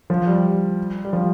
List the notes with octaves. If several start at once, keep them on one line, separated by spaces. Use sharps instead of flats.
F3
G3
G3
F3